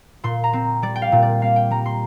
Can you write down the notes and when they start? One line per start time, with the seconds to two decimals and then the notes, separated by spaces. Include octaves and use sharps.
0.23 A#2 C6
0.44 A#5
0.53 C4
0.82 G3 D5
0.96 G5
1.02 F5
1.12 A#2
1.22 D5
1.41 A#3 F5
1.56 G5
1.71 G3 A#5
1.86 C6